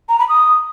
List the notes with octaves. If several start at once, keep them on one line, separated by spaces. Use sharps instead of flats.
A#5
B5
D#6